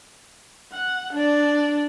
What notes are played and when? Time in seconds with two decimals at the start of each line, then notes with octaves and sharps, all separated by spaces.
0.73 F#5
1.13 D4 D5